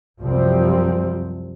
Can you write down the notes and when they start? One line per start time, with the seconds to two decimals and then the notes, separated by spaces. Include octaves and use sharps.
0.20 C2 F#2 C3 F3 G3 C4